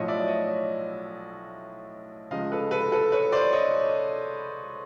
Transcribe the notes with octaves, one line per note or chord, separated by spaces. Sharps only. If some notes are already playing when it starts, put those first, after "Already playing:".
Already playing: B1 A2 F3 C#5 D#5
D5 E5
C#5 D#5
C#2 C#3 F3 D#5 F5
A4 B4
A4 B4
A4 B4
B4 C#5
C5 D5
C#5 D#5